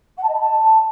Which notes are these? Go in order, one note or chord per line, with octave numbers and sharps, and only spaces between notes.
F#5
A5
D#5
B5
A5